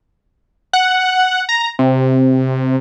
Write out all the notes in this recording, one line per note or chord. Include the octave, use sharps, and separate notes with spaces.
F#5
A#5
C3